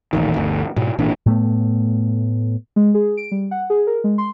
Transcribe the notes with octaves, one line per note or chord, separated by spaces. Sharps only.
D#1 A1 D#3
G1 D2
G#2 B2
G#1 A#2 E3 D4
A2 A3 B3
G#3
G#4
D7
G3
F#5
G#4
A#4
G#3
C6